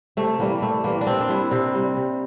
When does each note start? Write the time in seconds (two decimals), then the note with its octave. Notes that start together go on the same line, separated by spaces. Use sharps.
0.17 C3 A3
0.39 E3 G3 A#3
0.61 C3 A3
0.84 E3 G3 A#3
1.01 D4
1.07 C3 C4
1.20 D4
1.29 G3 E4
1.51 C3 C4
1.75 G3
1.97 C3